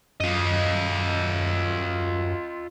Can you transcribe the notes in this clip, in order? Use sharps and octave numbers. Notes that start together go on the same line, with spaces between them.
F#2 F4 D#5